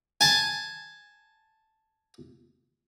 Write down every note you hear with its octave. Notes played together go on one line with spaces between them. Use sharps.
G#5 A5